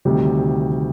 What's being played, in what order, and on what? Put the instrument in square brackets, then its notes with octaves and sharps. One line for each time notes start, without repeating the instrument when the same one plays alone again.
[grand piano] D2 C3 D#3 G3